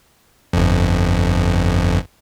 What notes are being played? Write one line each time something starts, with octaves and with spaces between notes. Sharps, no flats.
G1 F2